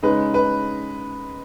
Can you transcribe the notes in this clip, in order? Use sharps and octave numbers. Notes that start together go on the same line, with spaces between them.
C#3 G#3 D#4 B4
B4